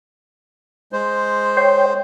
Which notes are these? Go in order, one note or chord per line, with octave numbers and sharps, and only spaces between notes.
G#3 C5
C#5 G5 C6